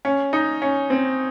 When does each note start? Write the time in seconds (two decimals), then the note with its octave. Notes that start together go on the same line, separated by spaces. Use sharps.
0.05 C#4
0.33 D#4
0.62 C#4
0.90 C4